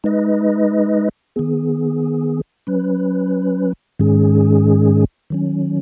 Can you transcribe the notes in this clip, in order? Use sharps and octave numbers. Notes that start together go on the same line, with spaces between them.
G#3 D#4 B4 D#5
D#3 B3 G#4
F#3 C#4 B4
G#2 D#3 G#3 C#4 G#4
D#3 F#3 C#4